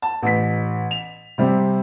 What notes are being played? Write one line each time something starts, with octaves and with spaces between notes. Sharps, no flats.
A5
A1 B6
F7
C3 G3 C4 G4